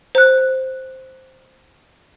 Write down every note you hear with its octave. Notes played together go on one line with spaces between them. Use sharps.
C5 F#6